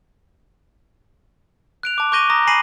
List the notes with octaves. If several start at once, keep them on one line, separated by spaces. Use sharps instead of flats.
F#6 D7 F7
A5 D6
C#6 D6 G6 A#6 D#7 G7
A#5 D#6 A#6
G#5 B5 A#6 C7 D#7 F#7